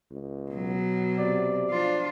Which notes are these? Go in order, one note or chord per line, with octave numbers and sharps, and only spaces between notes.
C#2
B2 F#3
C3 D5
F3 D4 F4